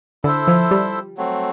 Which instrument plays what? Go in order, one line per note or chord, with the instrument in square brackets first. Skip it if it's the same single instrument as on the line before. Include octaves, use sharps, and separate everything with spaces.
[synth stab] D3 [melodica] E4 A4 C5 E5
[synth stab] F3
G3
[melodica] F#3 A3 C4